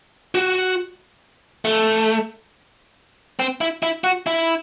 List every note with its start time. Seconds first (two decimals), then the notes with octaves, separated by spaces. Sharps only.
0.35 F#4
1.65 A3
3.39 C4
3.61 E4
3.83 E4
4.04 F#4
4.27 E4